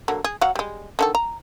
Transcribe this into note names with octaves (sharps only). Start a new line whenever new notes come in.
D3 F#3 A#3
G#4
F#3 F5 F#5
G3 G#3
D3 D#3 A4
A#5